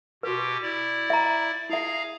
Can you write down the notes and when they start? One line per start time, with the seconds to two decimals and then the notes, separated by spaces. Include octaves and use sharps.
0.23 B2 F#4 G4 B4
0.62 E4 D5
1.10 E5 A#5
1.70 E4 G#4 E5 F5 A#5